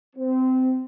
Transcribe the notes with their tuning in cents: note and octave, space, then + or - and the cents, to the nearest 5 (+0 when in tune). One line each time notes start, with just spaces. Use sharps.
C4 -20